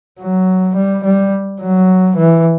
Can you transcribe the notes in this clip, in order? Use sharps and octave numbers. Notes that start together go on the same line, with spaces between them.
F#3
G3
G3
F#3
E3